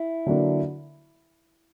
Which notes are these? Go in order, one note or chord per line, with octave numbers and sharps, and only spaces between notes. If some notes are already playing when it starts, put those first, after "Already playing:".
Already playing: E4
D3 F#3 A#3 D4